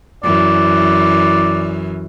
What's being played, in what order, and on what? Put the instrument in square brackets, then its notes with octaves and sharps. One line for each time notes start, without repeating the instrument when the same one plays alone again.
[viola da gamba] F#2 E3 [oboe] D5